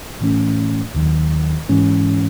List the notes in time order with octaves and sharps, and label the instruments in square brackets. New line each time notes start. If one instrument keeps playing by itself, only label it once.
[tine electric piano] A2 E3 A3 C#4
D#2 D#3 F#3
G#2 E3 G#3 C#4